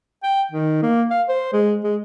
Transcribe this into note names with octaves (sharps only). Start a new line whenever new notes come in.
G5
D#3
A#3
F5
C5
G#3
G#3